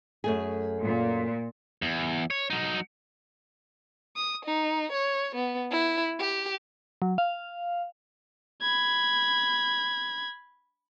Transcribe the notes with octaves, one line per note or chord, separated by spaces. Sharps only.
F#2 A3 G#4
A#2
E2
C#5
F#3 D#4
D#6
D#4
C#5
B3
E4
G4
F#3
F5
B5 G#6